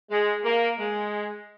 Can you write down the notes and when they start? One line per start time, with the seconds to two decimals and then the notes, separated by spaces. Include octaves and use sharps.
0.11 G#3
0.44 A#3
0.79 G#3